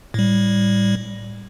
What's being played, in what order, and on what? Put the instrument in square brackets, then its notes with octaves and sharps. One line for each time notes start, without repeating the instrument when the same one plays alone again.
[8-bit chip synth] A2 G3